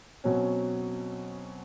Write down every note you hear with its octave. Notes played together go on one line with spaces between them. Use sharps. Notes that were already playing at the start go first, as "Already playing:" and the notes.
B2 F#3 C4 C#4